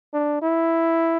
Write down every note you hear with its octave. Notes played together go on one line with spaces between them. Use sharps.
D4
E4